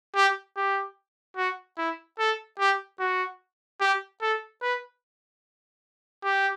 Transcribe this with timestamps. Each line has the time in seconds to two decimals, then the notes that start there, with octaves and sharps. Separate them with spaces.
0.15 G4
0.57 G4
1.37 F#4
1.78 E4
2.19 A4
2.59 G4
3.00 F#4
3.80 G4
4.21 A4
4.62 B4
6.23 G4